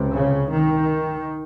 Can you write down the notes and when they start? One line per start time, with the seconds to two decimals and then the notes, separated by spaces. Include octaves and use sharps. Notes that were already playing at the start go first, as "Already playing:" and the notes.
Already playing: C#2 C3
0.13 C#3
0.50 D#3